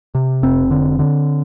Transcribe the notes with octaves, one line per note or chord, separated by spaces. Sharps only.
C3
F1 C4
D3
D3